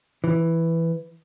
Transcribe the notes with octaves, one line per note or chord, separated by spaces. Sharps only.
E3